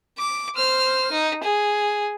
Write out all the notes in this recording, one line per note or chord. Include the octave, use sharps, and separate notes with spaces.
D6
C5 F6
D#4
G#4